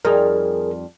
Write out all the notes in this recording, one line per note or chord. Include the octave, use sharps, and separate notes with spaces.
F2 G3 D#4 G#4 A#4